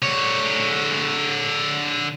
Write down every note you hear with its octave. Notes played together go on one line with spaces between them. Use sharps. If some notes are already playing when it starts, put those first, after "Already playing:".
D3 C#5